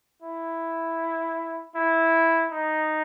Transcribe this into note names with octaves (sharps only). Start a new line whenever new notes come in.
E4
E4
D#4